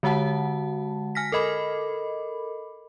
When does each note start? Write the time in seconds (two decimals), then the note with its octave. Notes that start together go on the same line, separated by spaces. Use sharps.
0.03 D3 G#3 F#4 F#5 A5
1.15 G#5 F6 A#6 B6
1.32 A4 A#4 D#5 B5 D6